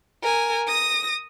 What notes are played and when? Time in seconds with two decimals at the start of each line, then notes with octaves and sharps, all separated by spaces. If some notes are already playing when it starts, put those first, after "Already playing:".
0.23 A#4 G#5
0.67 D#6 A#6